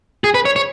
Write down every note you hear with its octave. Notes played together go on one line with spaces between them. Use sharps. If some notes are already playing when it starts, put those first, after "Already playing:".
G#4
B4
C#5
C#5